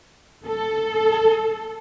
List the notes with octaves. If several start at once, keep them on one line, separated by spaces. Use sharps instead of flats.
A4